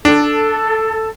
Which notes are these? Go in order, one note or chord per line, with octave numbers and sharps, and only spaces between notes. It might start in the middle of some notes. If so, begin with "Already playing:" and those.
D4 A4